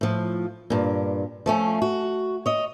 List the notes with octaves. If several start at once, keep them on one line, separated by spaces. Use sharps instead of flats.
A2 F3
G2 A#2
F3 A3 C#4
F#4
C#5 D#5